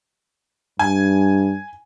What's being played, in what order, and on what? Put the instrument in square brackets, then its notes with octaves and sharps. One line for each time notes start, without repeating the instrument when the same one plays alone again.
[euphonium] G2 [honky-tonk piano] G#5